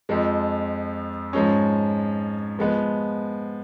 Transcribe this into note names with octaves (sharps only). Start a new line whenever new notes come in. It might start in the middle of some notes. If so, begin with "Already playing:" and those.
F2 F3 G#3
G#2 F3 G#3 C#4
F3 G#3 B3